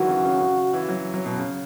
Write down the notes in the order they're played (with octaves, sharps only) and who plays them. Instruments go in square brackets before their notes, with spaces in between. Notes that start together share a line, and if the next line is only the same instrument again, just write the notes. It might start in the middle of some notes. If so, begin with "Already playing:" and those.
Already playing: [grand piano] D#3 E3 F#3 G#3 [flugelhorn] F#4
[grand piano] C#3
C#3
C#3
E3
F#3
F#3
B2
C#3